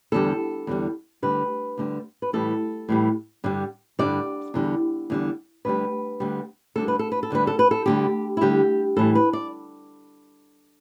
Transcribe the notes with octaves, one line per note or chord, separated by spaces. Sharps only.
E2 D3 G3 A4
E2 D3 G3
D2 D3 G3 B4
D2 D3 G3
B4
A2 E3 G3 A4
A2 E3 G3
G2 D3 G3
G2 D3 G3 D5
E2 D3 G3
E2 D3 G3
D2 D3 G3 B4
D2 D3 G3
D2 D3 G3 A4
B4
A4
B4
A4
D2 D3 G3 B4
A4
B4
A4
D2 D3 G3 G4
E4
D2 D3 G3 G4
A2 E3 G3 A4
B4
D5